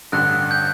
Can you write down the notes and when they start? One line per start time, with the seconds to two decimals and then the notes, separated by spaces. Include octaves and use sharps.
0.12 A1 G2 D3 F#6
0.51 G6